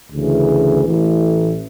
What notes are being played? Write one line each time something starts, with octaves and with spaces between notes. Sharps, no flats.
D2 C#3 E3
A1 A2 E3